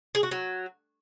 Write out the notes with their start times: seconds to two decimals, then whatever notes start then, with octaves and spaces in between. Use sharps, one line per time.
0.15 G#4
0.23 F#4
0.31 F#3